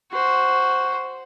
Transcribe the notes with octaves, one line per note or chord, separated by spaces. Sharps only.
F#4 C5